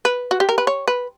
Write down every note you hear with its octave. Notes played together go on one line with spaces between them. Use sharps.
B4
F#4
G4
A#4
B4
C#5
B4